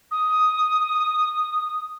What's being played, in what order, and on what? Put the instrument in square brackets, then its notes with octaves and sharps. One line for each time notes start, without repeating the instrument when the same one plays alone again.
[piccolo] D#6